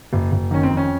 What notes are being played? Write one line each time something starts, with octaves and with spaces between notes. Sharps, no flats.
F#1
F#1
D#3 C#4
C4
F2
C#4